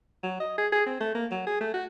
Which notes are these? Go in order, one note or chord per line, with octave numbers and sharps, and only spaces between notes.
F#3
D#5
G#4
G#4
C4
A3
A#3
F#3
G#4
A3
F#4